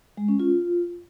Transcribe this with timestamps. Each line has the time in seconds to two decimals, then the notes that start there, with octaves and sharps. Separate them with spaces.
0.17 G#3
0.28 C#4
0.40 F4